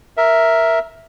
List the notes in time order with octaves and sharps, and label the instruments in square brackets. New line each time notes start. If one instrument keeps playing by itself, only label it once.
[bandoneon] A#4 E5